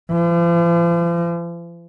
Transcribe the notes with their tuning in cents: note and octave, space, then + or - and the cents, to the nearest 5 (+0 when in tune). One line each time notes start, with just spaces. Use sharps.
F3 -45